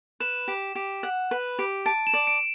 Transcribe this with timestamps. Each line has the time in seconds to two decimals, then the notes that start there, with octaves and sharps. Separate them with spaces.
0.20 B4 E7
0.48 G4
0.75 G4
1.03 F#5
1.31 B4
1.59 G4
1.86 A5 D7
2.07 E7
2.13 D5
2.27 D7